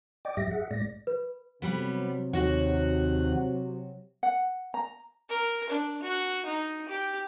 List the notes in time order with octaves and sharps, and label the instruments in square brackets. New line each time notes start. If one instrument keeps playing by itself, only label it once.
[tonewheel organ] D5 D#5 G5 D6
G#2 F#3 G4 E5 A#6
G#4 E5 F#5
A2 G#3 D5 A#6
[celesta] B4
[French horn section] C3 F#3 [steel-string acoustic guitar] G3 B3
[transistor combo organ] D#2 F#5 [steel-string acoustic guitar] F#4 C#5
[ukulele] F#5
A#5
[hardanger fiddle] A#4
D4
F#4
D#4
G4